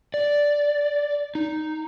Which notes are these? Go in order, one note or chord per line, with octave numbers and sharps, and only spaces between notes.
D5
D#4